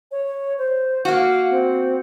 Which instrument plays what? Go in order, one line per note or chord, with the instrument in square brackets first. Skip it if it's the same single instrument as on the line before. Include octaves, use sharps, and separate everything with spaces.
[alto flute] C#5
C5
[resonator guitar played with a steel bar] A#3 F#4 [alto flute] F5
[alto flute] C4